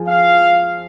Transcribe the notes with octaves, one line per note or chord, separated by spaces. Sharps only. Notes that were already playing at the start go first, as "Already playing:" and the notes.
Already playing: F3 G#4
F5